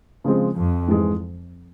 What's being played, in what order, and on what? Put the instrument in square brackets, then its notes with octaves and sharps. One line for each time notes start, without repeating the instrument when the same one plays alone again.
[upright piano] C#3 F3 G#3 C4
[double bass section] F2
[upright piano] G#2 E3 G#3